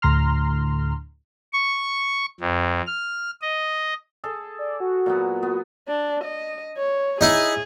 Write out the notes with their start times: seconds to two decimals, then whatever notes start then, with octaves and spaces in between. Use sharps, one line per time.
0.02 D2 A2 A#5 C6 F6
1.53 C#6
2.40 F2
2.87 F6
3.41 D#5
4.24 G#4 A4 A5
4.59 D5
4.80 F#4
5.06 A#2 F#3 B3
5.43 B3
5.88 D4
6.24 D#5
6.77 C#5
7.21 D#4 E4 G#4